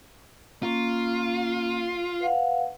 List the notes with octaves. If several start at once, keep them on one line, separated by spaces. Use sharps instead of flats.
A#3 C#4 F4
B4 F5 F#5